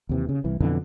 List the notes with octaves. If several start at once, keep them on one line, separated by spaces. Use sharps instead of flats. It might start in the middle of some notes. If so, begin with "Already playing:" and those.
D#2 C3 E3
C#3
C2 E3
F2 B2 D3 E3